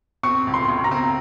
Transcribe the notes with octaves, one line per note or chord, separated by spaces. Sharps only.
C4 C#6
C#2
C6
C#3
A#5
C4